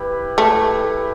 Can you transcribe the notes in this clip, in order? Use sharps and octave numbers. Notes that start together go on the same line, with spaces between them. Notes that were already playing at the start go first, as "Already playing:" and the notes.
Already playing: E4 G4 B4
A3